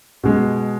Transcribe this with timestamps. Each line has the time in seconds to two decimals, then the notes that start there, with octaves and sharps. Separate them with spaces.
0.23 B2 G#3